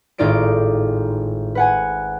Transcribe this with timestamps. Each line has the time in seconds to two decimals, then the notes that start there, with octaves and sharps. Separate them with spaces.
0.18 G#1 A2 D#4 F4 D5 D7
1.55 B4 F#5 G#5